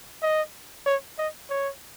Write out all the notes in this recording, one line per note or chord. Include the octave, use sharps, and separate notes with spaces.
D#5
C#5
D#5
C#5